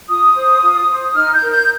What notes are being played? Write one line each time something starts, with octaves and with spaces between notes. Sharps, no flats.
F4 D#6
C5
F4
C5
D#4 F6
G6
A#4
G6